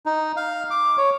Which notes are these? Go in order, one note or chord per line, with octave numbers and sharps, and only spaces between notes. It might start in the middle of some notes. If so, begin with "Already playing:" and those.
D#4
F5
D6
C#5